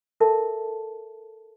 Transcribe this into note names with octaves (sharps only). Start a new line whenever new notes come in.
A4 A#4 E5 A5